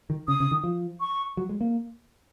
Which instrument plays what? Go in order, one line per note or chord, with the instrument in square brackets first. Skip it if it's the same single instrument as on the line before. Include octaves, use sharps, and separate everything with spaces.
[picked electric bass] D#3
[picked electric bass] C#3 [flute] D#6
[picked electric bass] C#3
D#3
F3
[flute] C#6
[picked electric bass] F#3
G#3
A#3